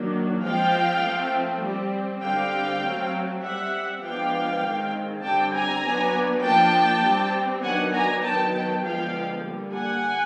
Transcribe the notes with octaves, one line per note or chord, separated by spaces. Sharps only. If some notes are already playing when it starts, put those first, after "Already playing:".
Already playing: D#3 F#3 A#3 D4
F3 G#3 C4 F5 G5
F3 A3 C4
G3 C4
D3 G3 C4 F5 G5
F#3 A3 C4
G3 C4 E5 F#5
F3 G#3 B3 D4 F5 G5
D#3 G#3 C4
D3 G3 C4 G5 A5
G#5 A#5
F#3 B3 D4
F3 A#3 D4 G5 A5
G3 C4
D#3 F#3 B3 D4 F#5 G#5
G#5 A#5
D#3 F#3 B3 G5 A5
G5 A5
D3 F3 G#3 B3 F5 G5
D3 G3 A#3
F#5 G#5